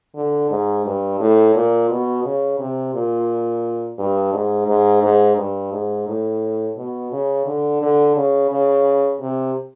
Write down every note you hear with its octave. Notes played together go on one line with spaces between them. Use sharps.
D3
G#2
G2
A2
A#2
B2
C#3
C3
A#2
G2
G#2
G#2
G#2
G2
G#2
A2
B2
C#3
D3
D3
C#3
C#3
C3